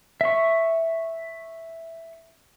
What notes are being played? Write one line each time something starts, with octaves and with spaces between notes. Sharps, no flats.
E5 C#6